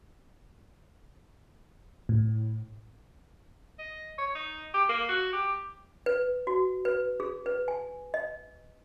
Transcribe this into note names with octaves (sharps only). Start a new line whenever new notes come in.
A2
D#5
C#5
D#4
G4
A#3
F#4
G4
B4
F#4
B4
G#4
B4
G#5
D#5